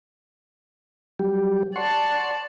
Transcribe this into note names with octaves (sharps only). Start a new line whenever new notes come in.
F#3 G3 G4
D5 F#5 A5 C6 C#6